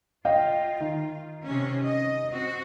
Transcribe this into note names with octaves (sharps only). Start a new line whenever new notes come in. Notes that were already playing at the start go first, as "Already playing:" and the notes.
F4 D#5 F5 G5
D#3
C3 C#4
D#5
C4 F#4